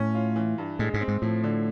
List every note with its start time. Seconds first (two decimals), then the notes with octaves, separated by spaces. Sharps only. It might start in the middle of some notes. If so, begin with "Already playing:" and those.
Already playing: A2 C#4
0.15 F4
0.36 E3
0.58 G2
0.79 A2 G#3
0.94 G#2
1.01 C4
1.08 G#2
1.22 A2 F3
1.44 D3